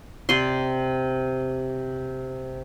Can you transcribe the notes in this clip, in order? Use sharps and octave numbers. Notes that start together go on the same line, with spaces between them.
C3 D5 C6